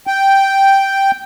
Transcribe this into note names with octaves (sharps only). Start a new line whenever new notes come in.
G5